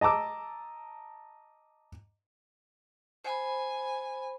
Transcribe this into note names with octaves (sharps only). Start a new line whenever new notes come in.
D#5 A5 A#5 D6 E6
C5 G#5 B5